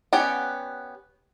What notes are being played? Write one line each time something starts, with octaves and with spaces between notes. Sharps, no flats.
B3 C#4 G4 D5 F#5